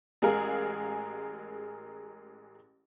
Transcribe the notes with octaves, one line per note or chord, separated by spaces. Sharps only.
A1 G#3 G#4 A#4 F5